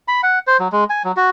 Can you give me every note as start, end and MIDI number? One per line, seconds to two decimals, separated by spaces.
0.08 0.21 83
0.23 0.39 78
0.47 0.57 72
0.59 0.68 54
0.72 0.84 56
0.90 1.03 80
1.04 1.12 54
1.17 1.30 66